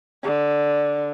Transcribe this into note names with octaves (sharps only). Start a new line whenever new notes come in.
D3